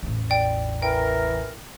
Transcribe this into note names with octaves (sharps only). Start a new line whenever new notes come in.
A1 E2
D5 G5
E3 A#4 G5